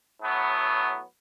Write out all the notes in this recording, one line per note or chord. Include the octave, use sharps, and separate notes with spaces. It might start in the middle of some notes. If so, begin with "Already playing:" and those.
A2 F#3 B3